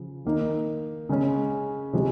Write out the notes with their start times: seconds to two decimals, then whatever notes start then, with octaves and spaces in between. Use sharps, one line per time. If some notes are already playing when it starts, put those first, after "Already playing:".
Already playing: C#3 F3
0.25 D#3 A#3 D#4
1.09 C#3 G#3 C#4
1.93 C3 F3 G#3